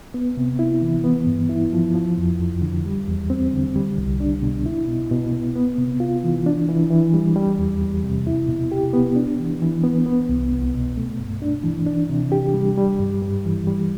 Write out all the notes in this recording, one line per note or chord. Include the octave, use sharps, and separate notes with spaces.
B3
C3
E4
E3
B3
G2
E4
F3
F3
F2
F2
D3
G3
E2
C4
D3
G3
C2
D4
B2
E4
B2
B2
B3
B3
C3
F4
E3
D4
E3
E3
G3
G3
E2
E2
C3
E4
B2
G4
B3
D4
E3
E3
B3
B3
C2
C2
B2
A3
G2
D4
E3
D4
C3
G4
G3
G3
G2
G2
E3
G3